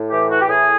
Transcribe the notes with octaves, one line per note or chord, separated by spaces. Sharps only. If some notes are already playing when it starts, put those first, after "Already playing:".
Already playing: A2
E3 G4
E3 F#4
G4
A2 G#4